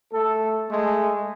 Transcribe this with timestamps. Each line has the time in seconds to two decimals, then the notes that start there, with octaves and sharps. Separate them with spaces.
0.12 A3 A4
0.70 G#3 A3